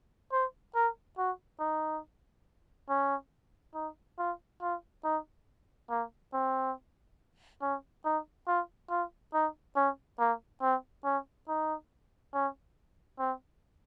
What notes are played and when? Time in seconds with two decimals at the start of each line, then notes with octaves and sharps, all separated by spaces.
0.32 C5
0.75 A#4
1.18 F#4
1.60 D#4
2.89 C#4
3.75 D#4
4.19 F4
4.62 F4
5.04 D#4
5.90 A#3
6.33 C4
7.62 C#4
8.05 D#4
8.47 F4
8.90 F4
9.34 D#4
9.76 C#4
10.20 A#3
10.62 C4
11.05 C#4
11.48 D#4
12.34 C#4
13.19 C4